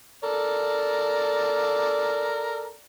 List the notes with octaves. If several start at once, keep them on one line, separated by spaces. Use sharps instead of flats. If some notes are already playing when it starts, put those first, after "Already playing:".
A4 A#4 D5